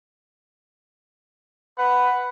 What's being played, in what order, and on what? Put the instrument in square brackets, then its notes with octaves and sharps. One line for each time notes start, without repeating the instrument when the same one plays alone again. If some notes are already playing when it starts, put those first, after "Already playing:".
[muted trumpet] B4 [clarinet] F#5